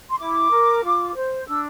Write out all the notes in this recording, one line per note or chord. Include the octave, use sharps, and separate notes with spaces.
C6
E4 D6
A#4
F4
C5
D4 E6